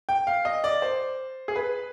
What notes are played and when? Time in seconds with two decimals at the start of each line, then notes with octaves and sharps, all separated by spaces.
0.09 G5
0.27 F5
0.45 D#5
0.64 D5
0.82 C5
1.48 G#4
1.56 B4